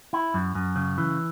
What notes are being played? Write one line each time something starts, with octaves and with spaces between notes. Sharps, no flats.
E4
F#2
F#2
C#3
E3